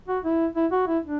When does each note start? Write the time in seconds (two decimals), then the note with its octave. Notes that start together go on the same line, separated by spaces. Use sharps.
0.08 F#4
0.24 E4
0.56 E4
0.72 F#4
0.88 E4
1.04 D4